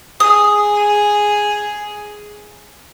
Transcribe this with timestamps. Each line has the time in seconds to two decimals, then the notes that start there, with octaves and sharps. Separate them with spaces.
0.20 G#4 D#6